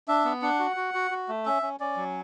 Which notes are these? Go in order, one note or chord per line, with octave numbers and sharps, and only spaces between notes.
D4 E5
B3
D4 F#5
F#4
F#4
F#4
F#4
A3
C#4 E5
C#4
C#4 D5
F#3